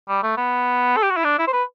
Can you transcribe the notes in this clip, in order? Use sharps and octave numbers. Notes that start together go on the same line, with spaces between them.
G3
A3
B3
A4
G4
F#4
E4
D4
E4
C5
B4